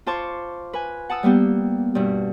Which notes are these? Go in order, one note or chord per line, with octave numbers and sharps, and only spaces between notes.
F4 C5 A5 C#6 D6
B4 G#5
F#5 A5 D#6 E6
G3 A#3 B3 G4
G2 B2